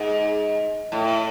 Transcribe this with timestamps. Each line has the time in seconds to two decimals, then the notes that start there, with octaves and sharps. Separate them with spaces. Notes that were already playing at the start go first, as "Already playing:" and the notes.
Already playing: G#2
0.92 A2